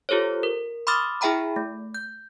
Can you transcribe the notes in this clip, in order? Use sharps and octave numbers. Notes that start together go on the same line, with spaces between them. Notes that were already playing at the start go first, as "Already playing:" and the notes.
F4 G4 A4 C5 C#5
A#4
B5 C6 D6 D#6 F6 A6
E4 G#4 E5 G5 A#5 B5
A3
G6